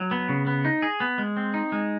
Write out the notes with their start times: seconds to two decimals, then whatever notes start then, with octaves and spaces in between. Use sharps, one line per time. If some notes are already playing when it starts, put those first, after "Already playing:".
Already playing: F#3
0.11 B3
0.29 C#3
0.47 B3
0.65 D#4
0.82 G#4
1.00 B3
1.18 G#3
1.37 C4
1.54 D#4
1.72 G#3